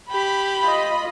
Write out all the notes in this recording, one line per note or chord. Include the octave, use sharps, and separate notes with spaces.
G4 B5
F4 D#5